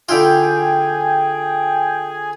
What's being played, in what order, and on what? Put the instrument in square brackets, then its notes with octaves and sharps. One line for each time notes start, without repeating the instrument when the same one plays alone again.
[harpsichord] D3 E4 F4 [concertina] G#4 G#5 [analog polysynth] G5